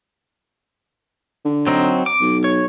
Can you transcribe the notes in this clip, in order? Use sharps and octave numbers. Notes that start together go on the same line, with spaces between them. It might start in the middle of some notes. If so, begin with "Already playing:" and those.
D3
F#3 C4 D#4
D6
B1
C#5